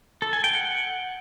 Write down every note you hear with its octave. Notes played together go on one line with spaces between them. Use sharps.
A4
G#5
G5
F#5